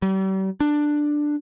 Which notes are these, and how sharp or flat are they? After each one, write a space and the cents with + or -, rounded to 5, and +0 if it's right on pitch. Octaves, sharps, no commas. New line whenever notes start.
G3 -40
D4 +10